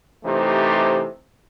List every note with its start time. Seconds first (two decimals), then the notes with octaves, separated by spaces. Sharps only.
0.24 C3 E3 A3 D#4 G4 C5